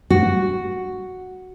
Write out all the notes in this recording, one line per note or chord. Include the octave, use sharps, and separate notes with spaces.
F#4